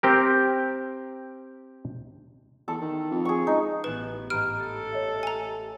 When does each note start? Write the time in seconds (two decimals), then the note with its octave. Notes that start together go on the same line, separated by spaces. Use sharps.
0.03 C4 G4 A#4
2.68 E2 A4
2.81 D#3
3.11 F2
3.25 G#4 C#6
3.47 C#2 D#4
3.84 A1 B3 B4 F#6 E7
4.30 A1 G#2 G4 D#5 A#5 B5 F6 D7
4.60 A4 A6
4.92 C#5 D#5 E5
5.23 G#5 A#5